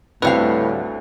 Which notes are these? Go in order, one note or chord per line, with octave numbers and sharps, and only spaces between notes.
D2 A2 D3 G3 C4 B4 F5